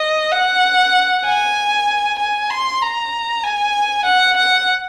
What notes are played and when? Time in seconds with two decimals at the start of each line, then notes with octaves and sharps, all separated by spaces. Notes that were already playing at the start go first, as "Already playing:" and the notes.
Already playing: D#5
0.32 F#5
1.25 G#5
2.19 G#5
2.50 C6
2.82 A#5
3.44 G#5
4.05 F#5
4.37 F#5